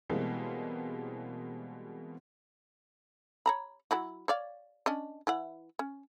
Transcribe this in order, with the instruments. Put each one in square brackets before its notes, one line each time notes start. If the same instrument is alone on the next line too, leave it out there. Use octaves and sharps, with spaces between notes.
[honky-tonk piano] B2 E3 G3 G#3 A#3 C4
[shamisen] C#5 A#5 B5
F#3 E4 F#4
C#5 D5 F5
C#4 D4 D#5
E3 E4 F#5
C#4